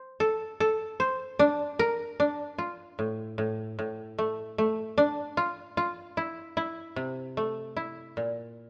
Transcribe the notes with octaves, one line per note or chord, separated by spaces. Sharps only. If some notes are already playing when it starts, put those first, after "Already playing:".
Already playing: C5
A4
A4
C5
D4
A#4
D4
F4
A2
A2
A2
A3
A3
D4
F4
F4
E4
E4
C3
A3
E4
A#2